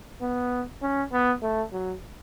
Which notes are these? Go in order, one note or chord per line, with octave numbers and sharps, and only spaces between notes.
B3
C#4
B3
A3
F#3